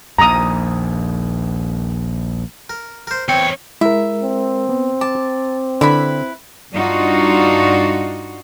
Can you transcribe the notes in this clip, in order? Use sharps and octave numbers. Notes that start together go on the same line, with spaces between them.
A#1 D#2 A#5 D#6
A#4
A#4 C5
E2 C4 C#5
G#3 E4 A#4 E5
C4
B3
A5 D6
D3 E4 B4 B5
G2 D4 D#4 F4 F#4